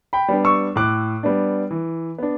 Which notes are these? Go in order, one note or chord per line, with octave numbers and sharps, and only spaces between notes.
G5 B5
G3 B3 D4
C#6 E6
A2 D6 F#6
G3 B3 D4
E3
B3 D4